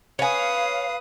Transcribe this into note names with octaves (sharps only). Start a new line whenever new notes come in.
B4 C#5 F5 G#5 D#6